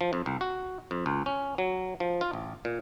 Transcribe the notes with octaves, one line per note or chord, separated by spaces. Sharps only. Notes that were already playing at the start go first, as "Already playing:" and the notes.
F3
F2
C2
F#4
F2
C#2
C#4
F#3
F3
F4
A1
A#2